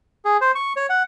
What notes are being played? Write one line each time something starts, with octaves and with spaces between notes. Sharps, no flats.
G#4
C5
C#6
C#5
F#5